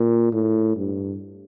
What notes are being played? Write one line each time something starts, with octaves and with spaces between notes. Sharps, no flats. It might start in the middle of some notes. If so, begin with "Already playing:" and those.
Already playing: A#2
A2
G2